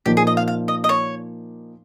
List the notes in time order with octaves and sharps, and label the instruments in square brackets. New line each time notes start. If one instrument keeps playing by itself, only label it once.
[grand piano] A#2 F3 A#3 D#4 [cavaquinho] G4
[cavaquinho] G#4
D#5
F5
F5
D#5
D#5
C#5